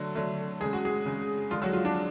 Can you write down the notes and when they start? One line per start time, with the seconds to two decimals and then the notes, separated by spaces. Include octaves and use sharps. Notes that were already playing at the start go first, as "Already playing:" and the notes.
Already playing: D3 F#3 A3
0.15 D3 F#3 A3
0.60 C#3 G#3 G#4
0.73 F#4
0.85 G#3 G#4
1.06 C#3 G#3
1.50 D3 F3 G#3 F4
1.62 F#3 F#4
1.73 F4
1.85 D4